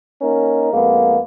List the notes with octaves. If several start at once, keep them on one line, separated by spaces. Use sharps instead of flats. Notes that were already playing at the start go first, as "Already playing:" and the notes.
A#3 C#4 D#4 A#4
F2 G#3 A#3 B3